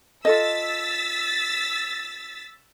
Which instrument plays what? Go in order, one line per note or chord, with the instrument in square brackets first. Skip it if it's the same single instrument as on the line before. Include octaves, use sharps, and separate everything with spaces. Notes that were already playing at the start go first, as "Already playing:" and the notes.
[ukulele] F4 A4 D#5 [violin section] E6 A6 B6